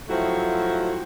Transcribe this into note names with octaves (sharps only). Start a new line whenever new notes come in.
F3 F#3 A3 C4 E4 F#4